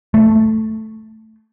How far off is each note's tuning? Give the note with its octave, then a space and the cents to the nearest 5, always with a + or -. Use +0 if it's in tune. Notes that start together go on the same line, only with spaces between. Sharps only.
A3 +0